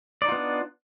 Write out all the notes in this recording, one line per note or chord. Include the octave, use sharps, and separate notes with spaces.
B3 D4 D#4 F4 D5